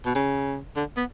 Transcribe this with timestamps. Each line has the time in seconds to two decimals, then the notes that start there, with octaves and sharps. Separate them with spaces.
0.06 B2
0.15 C#3
0.76 D3
0.97 B3